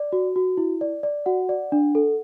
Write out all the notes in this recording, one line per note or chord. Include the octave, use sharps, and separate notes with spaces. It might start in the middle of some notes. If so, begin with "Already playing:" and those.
Already playing: D5
F#4
F#4
E4
D5
D5
F#4 F#5
D5
D4
A4